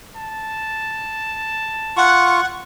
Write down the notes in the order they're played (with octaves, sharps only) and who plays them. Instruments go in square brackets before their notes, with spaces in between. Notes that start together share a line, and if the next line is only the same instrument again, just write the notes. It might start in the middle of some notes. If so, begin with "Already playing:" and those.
[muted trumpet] A5
[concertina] F4 C#6 [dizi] F#5